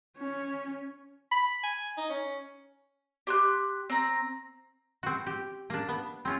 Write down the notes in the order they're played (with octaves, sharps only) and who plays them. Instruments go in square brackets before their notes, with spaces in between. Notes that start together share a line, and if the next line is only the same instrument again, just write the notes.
[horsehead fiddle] C#4
[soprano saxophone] B5
G#5
D#4
C#4
[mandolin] G4 C6 F#6
C4 A#5
[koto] C4 F#4
G4
A#3 D4
B3
C4 C#4 F4